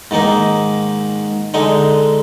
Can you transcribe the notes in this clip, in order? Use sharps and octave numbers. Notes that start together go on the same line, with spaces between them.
G#2 D#3 A#3 D#4
D3 G#3 D#4